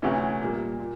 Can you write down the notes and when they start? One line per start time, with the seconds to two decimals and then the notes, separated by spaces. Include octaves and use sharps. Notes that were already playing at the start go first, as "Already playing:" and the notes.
0.02 D2 C3 E3 A3 C#4
0.41 A#2 G3 A#3
0.80 A#2